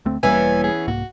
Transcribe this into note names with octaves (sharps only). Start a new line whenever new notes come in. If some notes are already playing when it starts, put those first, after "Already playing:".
D2 A3 C4
E1 E3 G3 A#3 B3 C#4 G#5
G#4
C2 G#2 A#3 F#4